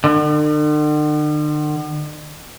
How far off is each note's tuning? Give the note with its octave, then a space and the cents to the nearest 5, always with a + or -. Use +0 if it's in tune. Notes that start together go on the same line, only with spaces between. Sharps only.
D3 +45